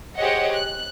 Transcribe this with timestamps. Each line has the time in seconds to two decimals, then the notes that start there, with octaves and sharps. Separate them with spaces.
0.17 G4 G#4 C5 C#5 D#5 F#5
0.53 F#6